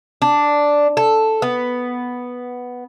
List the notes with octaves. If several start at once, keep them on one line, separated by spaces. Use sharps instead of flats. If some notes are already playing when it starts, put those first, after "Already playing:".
D4
A4
B3